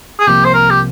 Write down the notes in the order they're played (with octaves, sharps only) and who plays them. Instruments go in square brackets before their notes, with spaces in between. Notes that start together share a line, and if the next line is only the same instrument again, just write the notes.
[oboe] G#4
[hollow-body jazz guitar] C2 C3 F3 A#3 [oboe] G4
[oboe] C5
A#4
G4